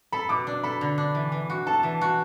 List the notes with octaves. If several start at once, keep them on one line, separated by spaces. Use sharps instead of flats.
A4 B5
B2 D6
D4
A4 B5
D3
D4
E3
E3
F#4
A4 A5
E3
F#4